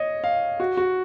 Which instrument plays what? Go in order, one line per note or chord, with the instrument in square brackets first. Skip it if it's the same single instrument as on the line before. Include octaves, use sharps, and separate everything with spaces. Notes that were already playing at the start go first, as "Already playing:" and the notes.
Already playing: [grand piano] C#5 D#5
F5
F#4
F#4